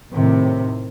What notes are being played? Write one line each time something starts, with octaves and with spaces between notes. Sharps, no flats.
A2 C3 D#3